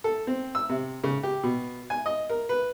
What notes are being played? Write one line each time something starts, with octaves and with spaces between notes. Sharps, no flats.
A4
C4
E6
C3
C#3
G4
B2
G#5
D#5
A#4
B4